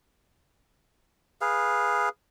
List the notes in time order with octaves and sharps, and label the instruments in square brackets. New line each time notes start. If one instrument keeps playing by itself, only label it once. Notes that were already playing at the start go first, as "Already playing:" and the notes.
[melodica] G#4 B4 F5